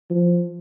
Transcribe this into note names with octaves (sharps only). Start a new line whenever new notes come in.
F3